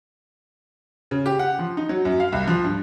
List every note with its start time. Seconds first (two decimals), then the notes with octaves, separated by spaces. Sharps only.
1.11 C#3
1.26 G4
1.39 F#5
1.59 F3
1.77 D#4
1.89 F#3
2.05 F#2
2.20 F5
2.32 C2
2.47 F3
2.64 G2